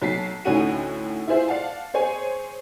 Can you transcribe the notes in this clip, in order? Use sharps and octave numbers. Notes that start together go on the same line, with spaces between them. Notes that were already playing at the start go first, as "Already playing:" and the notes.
B1 F#3 A5 B6 C7
D2 A2 C#4 D#4 F#4 D#7
E4 F4 G#4 C5 E5
D5 F5 F#5 A5
G#4 C5 C#5 G#5